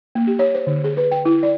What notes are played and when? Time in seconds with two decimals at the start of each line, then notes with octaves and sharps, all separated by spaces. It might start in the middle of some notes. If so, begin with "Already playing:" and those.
0.15 A#3
0.27 G4
0.39 C#5
0.55 C5
0.67 D3
0.84 G#4
0.97 B4
1.11 G5
1.25 E4
1.43 D5